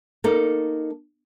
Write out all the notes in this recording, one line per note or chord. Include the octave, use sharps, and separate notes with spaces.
A#3 D#4 A4